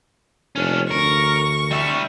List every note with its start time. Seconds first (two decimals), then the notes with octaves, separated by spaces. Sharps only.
0.56 F1 C#4 D4
0.91 D2 A#4 C#6
1.71 G3 E5